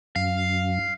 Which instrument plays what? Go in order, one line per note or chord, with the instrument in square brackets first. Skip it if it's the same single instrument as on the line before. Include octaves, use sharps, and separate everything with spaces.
[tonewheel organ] F#2 [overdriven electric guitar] F5